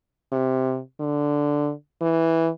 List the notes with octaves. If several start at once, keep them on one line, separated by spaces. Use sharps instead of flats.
C3
D3
E3